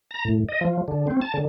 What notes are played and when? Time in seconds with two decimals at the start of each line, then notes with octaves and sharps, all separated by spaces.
0.11 A#5
0.25 A2
0.49 D#5
0.61 F3
0.88 D3
1.07 C4
1.21 A5
1.34 D3